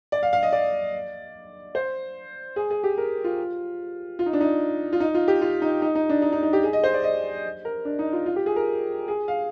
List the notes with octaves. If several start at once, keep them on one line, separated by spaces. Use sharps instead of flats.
D5
F5
F5
D#5
D5
C5
G#4
G#4
G4
A#4
F4
F4
D#4
D4
D#4
F4
D#4
F4
G4
F4
D#4
D#4
D#4
D4
D#4
D#4
D#4
G4
G#4
D#5
C5
D5
D#5
A#4
D4
D#4
F4
F4
G4
G#4
A#4
G#4
F5